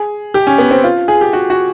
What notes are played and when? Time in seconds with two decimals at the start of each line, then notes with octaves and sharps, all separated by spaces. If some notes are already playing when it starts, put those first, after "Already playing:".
Already playing: G#4
0.34 G4
0.47 C#4
0.58 B3
0.71 C4
0.84 F4
1.08 G#4
1.21 G4
1.33 F#4
1.50 F#4